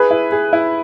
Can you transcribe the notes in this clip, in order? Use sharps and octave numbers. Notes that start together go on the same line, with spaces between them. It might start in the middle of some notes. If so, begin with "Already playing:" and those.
Already playing: E4 G#4 B4
E4
G#4
E4